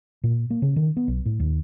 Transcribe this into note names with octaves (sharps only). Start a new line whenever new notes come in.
A#2
A#3
C#3
D#3
B3
B1
A2
D#2